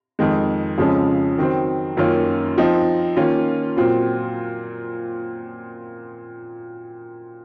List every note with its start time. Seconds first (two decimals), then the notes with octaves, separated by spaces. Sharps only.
0.19 F2 D#3 G#3
0.78 F2 C#3 F3 G#3 C#4
1.38 D#3 F#3 C4
1.97 F#2 D#3 A#3 C#4 F4
2.58 F3 C4 D#4
3.17 D#3 A#3 C#4 F4
3.77 A#2 F#3 C4 F4